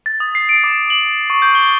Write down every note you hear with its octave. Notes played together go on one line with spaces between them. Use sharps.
A6
D#6
C7
D7
D6
F#7
F#7
C#6
G6
G7